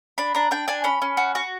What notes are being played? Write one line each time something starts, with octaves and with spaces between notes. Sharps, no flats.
D4 B5
D4 A#5
D4 G5
D4 G#5
C#4 B5
C#4
F#4
F#4